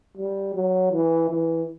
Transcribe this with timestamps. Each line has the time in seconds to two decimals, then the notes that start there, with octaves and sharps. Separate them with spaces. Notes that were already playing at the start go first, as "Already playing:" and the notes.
0.17 G3
0.54 F#3
0.92 E3
1.29 E3